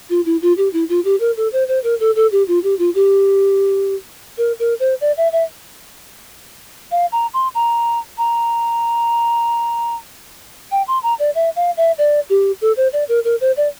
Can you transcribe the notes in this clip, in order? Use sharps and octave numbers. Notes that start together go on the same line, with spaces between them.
F4
E4
F4
G4
E4
F4
G4
A#4
A4
C5
C5
A#4
A4
A4
G4
F4
G4
F4
G4
A#4
A#4
C5
D5
E5
E5
F5
A#5
C6
A#5
A#5
G5
C6
A#5
D5
E5
F5
E5
D5
G4
A4
C5
D5
A#4
A#4
C5
D5